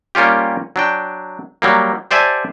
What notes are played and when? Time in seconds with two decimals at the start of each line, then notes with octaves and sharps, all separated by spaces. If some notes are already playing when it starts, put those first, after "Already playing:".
0.15 G3 A#3 C#4 F4 G4
0.76 F#3 D4 G5
1.62 F#3 G3 A#3
2.11 G4 C5 D5 E5 G#5 A5